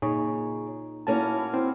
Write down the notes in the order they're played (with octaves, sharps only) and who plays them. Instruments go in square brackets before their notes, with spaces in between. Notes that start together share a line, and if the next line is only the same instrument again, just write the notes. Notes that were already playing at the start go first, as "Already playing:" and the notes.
[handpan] A#2 D#4 [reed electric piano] G#4 C#5
[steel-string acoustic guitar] A#3 C#4 F#4 [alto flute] E4 [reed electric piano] A5
[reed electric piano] C4 [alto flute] E4